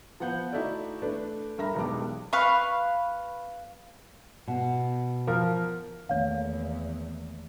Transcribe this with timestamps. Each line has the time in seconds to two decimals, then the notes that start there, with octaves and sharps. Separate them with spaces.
0.20 F3 B3 F#5 G6
0.52 A3 D#4 E4 F#4 A4 D5
1.02 A3 D4 B4
1.58 G2 A#4 E5 A#5 B5 A#6
1.75 E1 B1 G3 B3 D6
2.33 B4 F5 C#6
4.47 B2
5.27 F3 A#4
6.09 E2 D#3 A3 A#3 C#5 F5